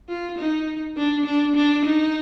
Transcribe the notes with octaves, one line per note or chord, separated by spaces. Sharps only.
F4
D#4
D4
D4
D4
D#4